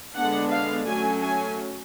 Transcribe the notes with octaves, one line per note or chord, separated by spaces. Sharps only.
D3 G#3 B3 D4 F#5
F5
F#3 A3 C#4 G#5
G#5